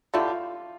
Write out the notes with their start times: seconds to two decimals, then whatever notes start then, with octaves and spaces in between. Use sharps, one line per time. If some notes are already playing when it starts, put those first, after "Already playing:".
0.14 D3 A3 E4 F4 G4